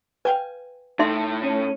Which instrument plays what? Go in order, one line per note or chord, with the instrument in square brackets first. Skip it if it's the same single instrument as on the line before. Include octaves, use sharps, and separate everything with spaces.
[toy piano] B4 [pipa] F5 G5 G#5
[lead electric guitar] A2 [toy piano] D#4 E5 C6
[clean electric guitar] C#4